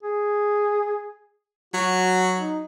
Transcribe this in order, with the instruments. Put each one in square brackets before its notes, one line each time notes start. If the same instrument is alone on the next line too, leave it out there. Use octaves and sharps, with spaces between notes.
[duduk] G#4
[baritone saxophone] F#3 [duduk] F#4
[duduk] D#4